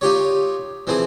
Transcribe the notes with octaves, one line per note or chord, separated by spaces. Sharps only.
D#4 F4 G4 C#5
E3 F3 C4 G#4